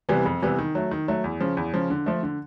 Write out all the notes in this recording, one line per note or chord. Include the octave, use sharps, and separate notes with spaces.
C3 E3 G3 B3
F2
C3 E3 G3 B3
D#3
F#3 A3
D#3
F#3 A3
E2
C#3 F3
E2
C#3 F3
D3
F3 A3
D3